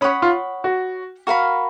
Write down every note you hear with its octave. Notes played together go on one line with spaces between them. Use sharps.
C#4 C#5 F#5 B5 D#6
F4
F#4
F#4 A#4 F5 B5